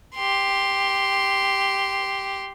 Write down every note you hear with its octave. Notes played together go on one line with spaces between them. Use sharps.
G4 C6